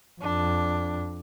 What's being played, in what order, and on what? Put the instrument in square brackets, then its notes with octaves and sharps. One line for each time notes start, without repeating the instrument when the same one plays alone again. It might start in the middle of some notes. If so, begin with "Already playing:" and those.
[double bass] F2 [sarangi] D4